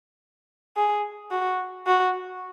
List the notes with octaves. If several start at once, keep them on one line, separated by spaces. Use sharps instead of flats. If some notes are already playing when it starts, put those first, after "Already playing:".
G#4
F#4
F#4